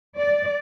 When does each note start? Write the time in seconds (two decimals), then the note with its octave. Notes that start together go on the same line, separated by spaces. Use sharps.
0.18 D5